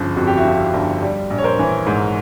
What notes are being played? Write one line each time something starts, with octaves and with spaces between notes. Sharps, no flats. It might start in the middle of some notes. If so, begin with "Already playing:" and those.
Already playing: G1 C#3 F3
F2 F#4
G4
E4 F#4
F3
G1
G3
A#1
C#5
A#4 C5
E3
G#2